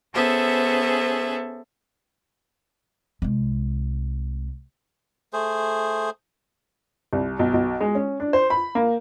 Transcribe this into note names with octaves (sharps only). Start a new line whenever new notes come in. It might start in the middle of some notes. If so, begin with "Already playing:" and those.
B3 C#4 G#4 A4 C5 E5
C2 G#3
A3 G#4 C5
C2
B1
B1
G#3
C#4
D4
C5
B5
A#3